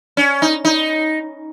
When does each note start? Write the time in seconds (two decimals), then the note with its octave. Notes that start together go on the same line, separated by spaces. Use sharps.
0.17 C#4
0.42 D#4
0.65 D#4